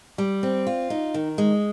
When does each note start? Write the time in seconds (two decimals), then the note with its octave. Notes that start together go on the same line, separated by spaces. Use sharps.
0.18 G3
0.43 C4
0.67 F4
0.90 D#4
1.14 D#3
1.38 G#3